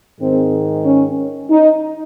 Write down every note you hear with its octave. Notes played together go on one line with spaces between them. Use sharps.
G#2 D#3 G#3 C4
C#4
D#4